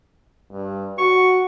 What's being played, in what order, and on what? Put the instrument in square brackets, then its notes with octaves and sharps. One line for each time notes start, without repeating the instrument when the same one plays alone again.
[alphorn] G2
[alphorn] F#4 [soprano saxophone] C#6